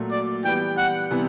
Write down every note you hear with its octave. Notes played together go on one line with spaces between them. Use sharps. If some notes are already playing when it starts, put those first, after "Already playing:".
Already playing: A#2 F#3 A3
D5
E3 G3 B3 G5
F#5
C3 E3 G3 B3